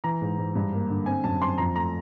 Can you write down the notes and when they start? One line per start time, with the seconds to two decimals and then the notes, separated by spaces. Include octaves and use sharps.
0.04 E3 A#5
0.21 G#2
0.38 G#2
0.55 G2
0.73 A#3
0.90 D3
1.06 C4 G#5
1.24 F#2 A5
1.42 C4 C6
1.58 F2 A#5
1.75 A3 A#5